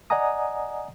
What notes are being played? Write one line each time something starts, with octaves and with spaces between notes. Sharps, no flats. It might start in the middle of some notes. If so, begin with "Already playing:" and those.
D5 D#5 F#5 G#5 A#5 D#6